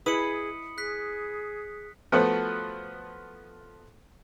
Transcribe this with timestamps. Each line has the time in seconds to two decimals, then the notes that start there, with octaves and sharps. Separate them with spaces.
0.06 E4 G#4 B4 D#5 B5 D#6 C#7
0.78 G#4 F#6 B6
2.12 F3 A3 B3 F#4 A4 B4